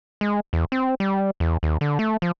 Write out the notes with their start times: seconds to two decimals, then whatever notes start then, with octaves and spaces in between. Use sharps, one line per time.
0.21 G#3
0.53 E2
0.72 C4
1.00 G3
1.40 E2
1.63 D#2
1.81 D3
1.99 A3
2.22 F3